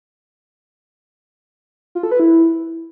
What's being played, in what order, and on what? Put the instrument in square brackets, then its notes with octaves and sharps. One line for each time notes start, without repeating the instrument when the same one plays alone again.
[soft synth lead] F4
A4
B4
E4